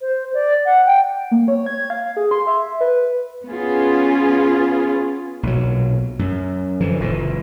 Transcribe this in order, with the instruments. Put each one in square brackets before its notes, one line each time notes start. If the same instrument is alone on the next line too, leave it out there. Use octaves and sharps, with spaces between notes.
[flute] C5
D5
F#5
G5
[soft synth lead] A#3
C#5
G#6
F5
G#4
C6
E5
B4
[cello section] B3 C#4 F4 G#4
[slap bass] B1 A#2 F#3
F#2
D3 E3 F3
F#1 A#2 C#3 E3